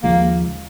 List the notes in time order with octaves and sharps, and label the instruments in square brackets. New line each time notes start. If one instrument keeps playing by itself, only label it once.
[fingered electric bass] D#2 C#3 F3 G#3 [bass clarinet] A#3